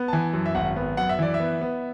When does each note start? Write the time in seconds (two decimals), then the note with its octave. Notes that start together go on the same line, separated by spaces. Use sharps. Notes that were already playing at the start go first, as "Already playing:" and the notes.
Already playing: B3
0.08 A5
0.13 E3 G#5
0.33 F#2
0.46 E5
0.55 G#1 F#5
0.76 B3
0.97 F#2 F#5
1.09 E5
1.19 E3 D5
1.34 E5
1.40 B3
1.61 B3